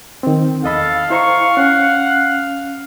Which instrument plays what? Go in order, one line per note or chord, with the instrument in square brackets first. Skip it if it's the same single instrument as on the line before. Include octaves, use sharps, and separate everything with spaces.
[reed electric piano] D#3 C4
[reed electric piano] E2 D#5 B5 [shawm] A4 [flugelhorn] F5
[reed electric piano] E4 C5 A#5 [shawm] C#6
[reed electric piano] C#4 [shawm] F#5